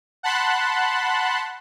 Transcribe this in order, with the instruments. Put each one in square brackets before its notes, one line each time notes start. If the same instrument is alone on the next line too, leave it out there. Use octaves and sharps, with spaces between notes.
[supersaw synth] F#5 A5 B5 C6 F#6